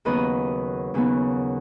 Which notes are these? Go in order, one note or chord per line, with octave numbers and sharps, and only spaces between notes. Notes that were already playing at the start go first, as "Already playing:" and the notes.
D#2 C#3 F#3 B3 D#4 B4 D#5
D#2 C#3 F#3 B3 D#4